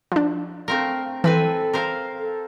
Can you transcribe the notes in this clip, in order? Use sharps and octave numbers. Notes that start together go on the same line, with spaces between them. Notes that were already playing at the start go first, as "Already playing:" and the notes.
F3 D4
A3 C4 A#4 F5
E3 C4 A4 B4 G#5
A#4 C5 F5
A4